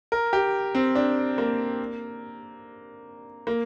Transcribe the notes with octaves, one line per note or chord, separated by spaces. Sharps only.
A#4
G4
C4
D4
A#3
A#3